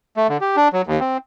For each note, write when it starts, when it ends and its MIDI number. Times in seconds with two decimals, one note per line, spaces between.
0.17 0.27 57
0.29 0.37 50
0.41 0.56 67
0.57 0.68 62
0.73 0.82 54
0.87 1.00 39
1.00 1.17 60